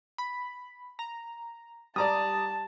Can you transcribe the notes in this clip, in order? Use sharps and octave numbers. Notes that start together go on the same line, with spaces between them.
B5
A#5
G3 D5 A5 A#5 D#6